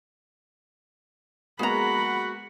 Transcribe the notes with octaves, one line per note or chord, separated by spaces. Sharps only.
G#3 A#3 B3 F#4 G#4 F#5 A#5 B5